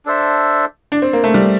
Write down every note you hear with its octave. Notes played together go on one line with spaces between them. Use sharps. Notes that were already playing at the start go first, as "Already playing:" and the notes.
D4 A4 C5 E5
D4
C4
A#3
A3
G3